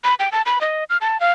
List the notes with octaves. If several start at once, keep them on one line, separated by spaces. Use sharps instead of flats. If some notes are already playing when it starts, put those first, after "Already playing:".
B5
G5
A5
B5
D#5
F6
A5
F5